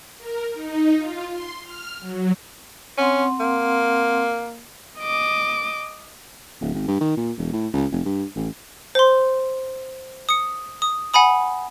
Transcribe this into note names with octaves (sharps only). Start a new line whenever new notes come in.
A#4
D#4
F4
C6
F6
F#3
C4 C#4 F#5 C6
A#3
D#5 D6
D1
G#1
G2
D#3
A#2
E1
A2
C#2
F1
G2
A1
C5 C6
D#6 C#7
D#6
F#5 G#5 B5 D#6